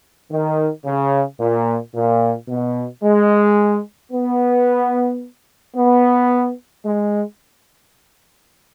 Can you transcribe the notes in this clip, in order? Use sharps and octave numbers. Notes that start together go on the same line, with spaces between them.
D#3
C#3
A#2
A#2
B2
G#3
B3
B3
G#3